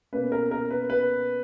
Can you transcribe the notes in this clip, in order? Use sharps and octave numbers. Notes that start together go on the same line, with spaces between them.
B2 A#3 C#4 B4
A#4
A#4
B4
B4